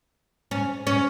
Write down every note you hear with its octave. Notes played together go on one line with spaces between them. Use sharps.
C#4
C#4